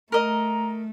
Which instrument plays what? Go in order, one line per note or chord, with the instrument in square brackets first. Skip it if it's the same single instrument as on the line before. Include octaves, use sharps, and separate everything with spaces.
[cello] A3 [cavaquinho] A#4 D#5 [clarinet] A#5